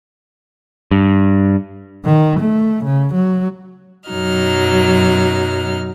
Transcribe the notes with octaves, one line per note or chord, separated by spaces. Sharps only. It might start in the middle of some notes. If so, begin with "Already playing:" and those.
G2
D#3
A3
C#3
F#3
F#2 B2 F#3 D#4 F6